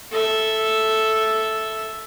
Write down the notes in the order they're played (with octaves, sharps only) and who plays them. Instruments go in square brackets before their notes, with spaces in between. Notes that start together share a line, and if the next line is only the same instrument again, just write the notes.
[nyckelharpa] A4 E5